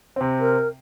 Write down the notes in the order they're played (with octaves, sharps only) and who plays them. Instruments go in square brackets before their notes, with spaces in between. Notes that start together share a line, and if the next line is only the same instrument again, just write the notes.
[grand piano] C3 C4
[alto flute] A#4